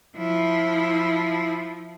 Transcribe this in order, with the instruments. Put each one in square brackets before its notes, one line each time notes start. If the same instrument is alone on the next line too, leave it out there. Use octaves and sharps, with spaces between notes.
[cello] F3 E4